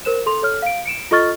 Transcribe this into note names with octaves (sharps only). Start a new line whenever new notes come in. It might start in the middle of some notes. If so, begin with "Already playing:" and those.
A#4 C5 E7
A4 C6 F7
A4 C#5 F6
F5 D7
C#7 D7 E7
F4 A4 D#5 C#6 F6 A6